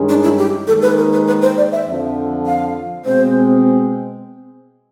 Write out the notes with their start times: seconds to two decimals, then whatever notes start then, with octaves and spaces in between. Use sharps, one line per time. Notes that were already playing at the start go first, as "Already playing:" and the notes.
Already playing: G2 D#3 G#3 C#4
0.09 D4
0.23 E4
0.38 G4
0.67 D#2 D#3 G#3 A4
0.82 B4
0.98 A#4
1.12 B4
1.27 B4
1.42 C5
1.58 D5
1.72 E5
1.87 F2 D3 F3
2.46 F5
3.05 B2 G#3 C4 C5